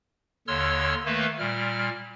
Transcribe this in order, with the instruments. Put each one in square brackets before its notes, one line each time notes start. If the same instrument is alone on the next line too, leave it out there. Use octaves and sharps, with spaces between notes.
[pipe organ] D#2 D3 C#5 C6 E6 F6
D#3 A3 A#3 B4
A#2 G3 F6